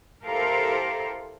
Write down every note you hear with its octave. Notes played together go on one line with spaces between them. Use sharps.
E4 G4 A4 A#4 C5 F5